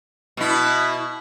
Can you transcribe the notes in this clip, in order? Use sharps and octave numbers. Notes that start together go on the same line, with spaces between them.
B2 E4